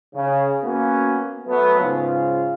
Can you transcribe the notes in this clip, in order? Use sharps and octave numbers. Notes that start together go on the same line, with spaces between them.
C#3
A#3 B3 C#4 F#4
F#3 A3 B3
G#2 C#3 F4